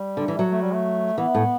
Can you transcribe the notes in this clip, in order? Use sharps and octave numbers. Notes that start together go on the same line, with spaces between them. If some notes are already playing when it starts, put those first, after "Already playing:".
Already playing: G3
D3
E3
F#3
A3
G3
A3
E3 B3
A2